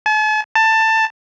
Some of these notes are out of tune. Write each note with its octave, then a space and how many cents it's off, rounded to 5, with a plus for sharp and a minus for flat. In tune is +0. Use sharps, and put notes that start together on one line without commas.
A5 -45
A5 +15